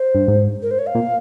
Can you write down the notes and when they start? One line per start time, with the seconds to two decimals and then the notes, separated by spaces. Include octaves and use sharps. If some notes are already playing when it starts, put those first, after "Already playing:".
Already playing: C5
0.15 G2
0.28 G#2
0.62 A#4
0.71 C5
0.79 C#5
0.87 F5
0.95 A#2